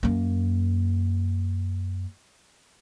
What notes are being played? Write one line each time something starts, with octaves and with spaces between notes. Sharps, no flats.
F#2 A#3